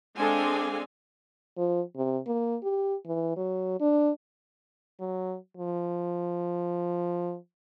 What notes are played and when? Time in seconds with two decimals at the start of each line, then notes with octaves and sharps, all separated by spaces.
0.18 G#3 C4 D4 A4 F5 G#5
1.57 F3
1.96 C3
2.27 A#3
2.63 G4
3.07 E3
3.37 F#3
3.80 D4
5.00 F#3
5.57 F3